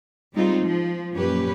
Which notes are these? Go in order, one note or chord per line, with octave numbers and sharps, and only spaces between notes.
G3 G#3 C4 D#4 F4
F3
F#2 A#2 C#4 G4 B4